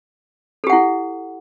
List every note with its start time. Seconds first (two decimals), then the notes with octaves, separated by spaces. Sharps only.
0.64 A4
0.67 G4
0.70 F#5
0.73 E4